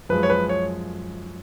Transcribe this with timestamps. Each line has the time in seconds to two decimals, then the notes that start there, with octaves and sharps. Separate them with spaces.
0.09 F#2 F3 G#3 B4
0.23 C#5
0.30 B4
0.49 C#5